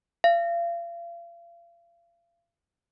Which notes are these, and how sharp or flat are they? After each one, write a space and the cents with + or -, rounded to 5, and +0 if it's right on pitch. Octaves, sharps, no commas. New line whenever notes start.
F5 -35